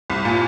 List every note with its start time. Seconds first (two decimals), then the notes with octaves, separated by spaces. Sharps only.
0.10 C2
0.25 A#2